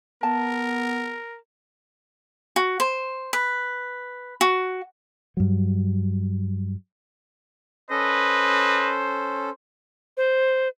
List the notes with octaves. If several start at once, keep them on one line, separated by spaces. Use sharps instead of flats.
B3 A#4 A5
F#4
C5
B4
F#4
G2 F#3
C#4 A4 B4 C5 D#5
C5